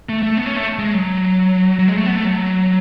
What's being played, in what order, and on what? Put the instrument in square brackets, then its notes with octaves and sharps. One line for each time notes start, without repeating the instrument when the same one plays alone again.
[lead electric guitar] A3
A3
B3
C#4
A3
G#3
F#3
F#3
G#3
A3
B3
A3
F#3